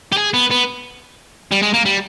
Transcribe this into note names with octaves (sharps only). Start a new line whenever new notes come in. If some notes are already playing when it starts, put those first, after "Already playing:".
G4
G#4
B3
B3
G3
G#3
A#3
G3